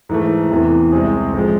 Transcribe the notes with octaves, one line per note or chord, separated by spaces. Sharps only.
G#2 E3 A3
E2 C3 E3
C2 C3 G#3 C4 G#4
A1 F3 G#3